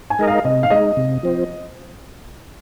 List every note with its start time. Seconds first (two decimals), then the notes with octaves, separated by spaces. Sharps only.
0.10 G#5
0.19 G#3 D#4 A#4 D#5
0.28 F5
0.45 C3 D#5
0.63 F5
0.70 G#3 D#4 D#5
0.97 C3
1.23 F3 C4